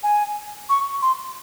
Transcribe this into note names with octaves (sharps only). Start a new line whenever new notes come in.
G#5
C#6
C6